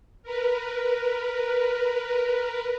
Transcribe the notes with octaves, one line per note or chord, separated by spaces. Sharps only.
A#4 B4